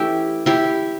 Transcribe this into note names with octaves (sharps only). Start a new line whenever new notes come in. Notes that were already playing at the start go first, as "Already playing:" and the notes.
Already playing: E3 A3 C#4 E4 G4 A4
E4 G4